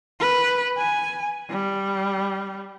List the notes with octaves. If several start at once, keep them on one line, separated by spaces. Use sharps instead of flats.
B4
G#5
G3